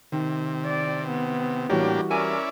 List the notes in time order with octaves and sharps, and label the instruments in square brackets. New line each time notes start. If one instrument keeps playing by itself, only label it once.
[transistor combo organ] C3 [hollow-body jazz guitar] D#3
[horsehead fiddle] D5
B3
[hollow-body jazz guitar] A2 C#5 [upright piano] E3 G3 F#4 [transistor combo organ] A#3 D4 G4
[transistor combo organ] C#4 E4 D5 [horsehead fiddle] A#4 [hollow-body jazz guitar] G#5